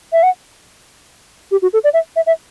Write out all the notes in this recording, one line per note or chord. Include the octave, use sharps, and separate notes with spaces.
E5
F#5
G4
F#4
A4
D5
E5
E5
E5